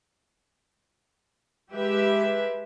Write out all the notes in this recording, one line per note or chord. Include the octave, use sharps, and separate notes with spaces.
G#3 G4 B4 E5